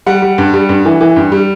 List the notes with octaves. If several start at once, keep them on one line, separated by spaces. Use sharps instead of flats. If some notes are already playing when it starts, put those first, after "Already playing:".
G3 F#5
G3
G2
G3
G2
E3
E3
G2
G3